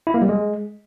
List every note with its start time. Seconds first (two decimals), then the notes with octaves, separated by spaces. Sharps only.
0.07 E4
0.14 A#3
0.22 G3
0.29 G#3